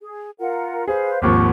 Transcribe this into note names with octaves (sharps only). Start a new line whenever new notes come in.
G#4
F4 A#4 F#5
G#4 B4 C5 F5
G#1 D#2 F3 F#5 C#6 D6